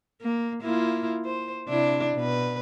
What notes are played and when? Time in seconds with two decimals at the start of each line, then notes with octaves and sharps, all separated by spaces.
0.21 A#3
0.62 A#3 E4 F4
1.25 C5
1.69 C3 D4 E4
2.16 B2 B4